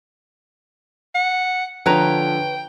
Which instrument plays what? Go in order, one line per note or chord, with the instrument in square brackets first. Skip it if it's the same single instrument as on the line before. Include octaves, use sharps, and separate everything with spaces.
[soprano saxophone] F#5
[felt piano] D3 F3 [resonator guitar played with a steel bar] B4 C#5 A#5 [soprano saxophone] G5